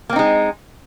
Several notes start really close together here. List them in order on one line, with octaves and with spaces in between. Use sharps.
A#3 C4 D#4 G#3